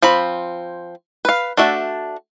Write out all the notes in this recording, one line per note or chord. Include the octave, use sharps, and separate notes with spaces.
F3 C4 B5
B4 F5
A3 D4 F#4 E5